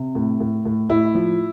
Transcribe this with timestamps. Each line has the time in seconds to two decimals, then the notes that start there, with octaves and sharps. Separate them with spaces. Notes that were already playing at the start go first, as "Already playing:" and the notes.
Already playing: C3
0.15 A2
0.40 A2
0.65 A2
0.89 A2 E4
1.15 F3